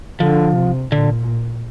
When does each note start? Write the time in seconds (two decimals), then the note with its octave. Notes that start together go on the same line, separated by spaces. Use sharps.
0.20 D3 F3
0.56 C3
0.92 A#2 D3